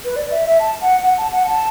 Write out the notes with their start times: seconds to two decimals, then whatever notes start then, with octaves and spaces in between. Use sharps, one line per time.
0.05 B4
0.16 D5
0.31 E5
0.45 E5
0.60 A5
0.81 F#5
1.03 F#5
1.18 A5
1.33 F#5
1.47 A5